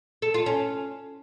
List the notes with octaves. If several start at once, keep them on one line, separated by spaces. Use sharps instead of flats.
A4
F4
C#4